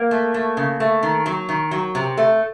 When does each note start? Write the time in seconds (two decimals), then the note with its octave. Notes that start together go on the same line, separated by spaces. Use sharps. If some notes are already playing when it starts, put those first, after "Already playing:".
Already playing: A#3
0.11 A3
0.34 A3
0.57 C#3
0.80 A3
1.03 D#3
1.26 F#3
1.49 D#3
1.71 F#3
1.95 C3
2.17 A3